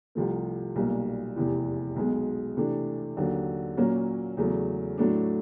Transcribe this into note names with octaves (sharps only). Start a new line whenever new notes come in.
C2 C3 F3 A3
B1 A#2 G3 A#3
F1 E2 C3 E3
B1 B2 G#3
C3 E3 A3 D4
D#2 D3 F#3
A#2 F#3 A#3 C#4
E2 C#3 F#3 A3
A2 F#3 A3 D4